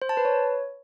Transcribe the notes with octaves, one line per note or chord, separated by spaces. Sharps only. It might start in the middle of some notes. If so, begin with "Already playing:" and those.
C5
A5
B4
C#5